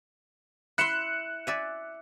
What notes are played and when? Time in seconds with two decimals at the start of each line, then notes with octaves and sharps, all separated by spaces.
0.78 E4 E5 C6 F#6 C#7 E7
1.47 D5 E5 G#5